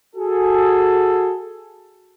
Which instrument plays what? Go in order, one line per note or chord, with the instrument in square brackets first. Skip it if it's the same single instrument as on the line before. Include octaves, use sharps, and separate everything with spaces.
[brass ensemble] F#4 G#4 A4